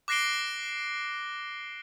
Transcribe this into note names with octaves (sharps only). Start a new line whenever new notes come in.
D6 F#6 A#6 C7 D7 G7